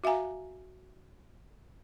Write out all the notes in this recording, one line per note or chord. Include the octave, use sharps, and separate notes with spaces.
F#4 E5 F5 G#5 A#5